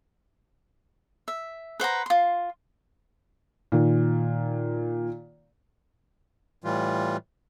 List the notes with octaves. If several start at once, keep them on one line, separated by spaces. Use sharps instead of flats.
E5
B4 C5 F#5 A#5
F4 C6
A#2 D#3
A2 E3 G3 F4